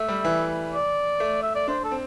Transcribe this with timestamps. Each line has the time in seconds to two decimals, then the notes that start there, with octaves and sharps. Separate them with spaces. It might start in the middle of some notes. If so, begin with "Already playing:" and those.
Already playing: A3 E5
0.09 G3
0.25 E3
0.72 D5
1.20 A3
1.43 E5
1.55 D5
1.68 D4 C5
1.84 A4
1.91 C4